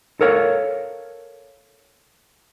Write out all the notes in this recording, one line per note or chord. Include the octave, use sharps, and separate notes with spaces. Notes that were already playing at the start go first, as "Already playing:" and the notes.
A4 A#4 C#5 F5